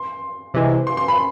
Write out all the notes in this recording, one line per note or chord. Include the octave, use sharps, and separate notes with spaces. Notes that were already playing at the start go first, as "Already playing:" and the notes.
Already playing: C6
C3 E3 G#3
C6
C6
B5